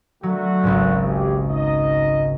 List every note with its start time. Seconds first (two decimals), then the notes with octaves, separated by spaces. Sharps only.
0.23 D3 F#3 A3 F#4
0.63 G#1 C#2 G#2
1.05 G4 G#4
1.50 D#4 D#5